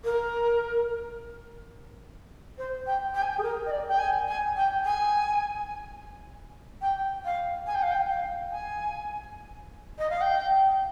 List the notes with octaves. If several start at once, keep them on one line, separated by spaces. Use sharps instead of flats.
A#4
C5
G5
G5
G#5
G5
G#4
A#4
D#5
D5
G5
G#5
G#5
G5
G#5
G5
F5
G#5
G5
F5
G5
F5
G#5
D#5
F5
G5